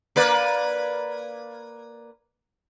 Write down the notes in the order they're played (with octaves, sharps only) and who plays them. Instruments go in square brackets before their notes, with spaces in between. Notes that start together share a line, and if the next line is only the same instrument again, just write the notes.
[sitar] A#3 B4 D5